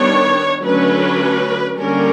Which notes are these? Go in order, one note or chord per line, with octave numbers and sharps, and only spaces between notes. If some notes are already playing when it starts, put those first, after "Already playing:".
Already playing: D#3 G3 B3 D4 C#5
D3 F#3 A3 C#4 B4
D3 G3 A#3 C#4 A#4